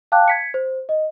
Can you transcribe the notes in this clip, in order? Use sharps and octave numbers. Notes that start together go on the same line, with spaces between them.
F5 G5 A5 D6 F#6
G#6 B6 C#7
C5
D#5